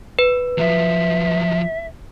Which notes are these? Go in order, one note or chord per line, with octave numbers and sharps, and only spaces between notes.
B4
F3 F#3 E5